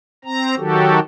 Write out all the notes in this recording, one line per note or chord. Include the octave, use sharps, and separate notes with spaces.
C4 A#5
D#3 F#3 F#4 G4 A4